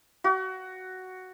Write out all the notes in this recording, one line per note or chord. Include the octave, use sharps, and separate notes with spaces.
F#4